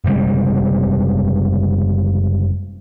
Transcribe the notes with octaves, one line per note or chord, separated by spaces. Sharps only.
F#1 C3 G3 G#3